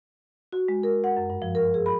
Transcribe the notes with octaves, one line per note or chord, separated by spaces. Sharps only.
F#4
G#3
A#4
F#5
F#2
G2
F3
A#4
G#4
B5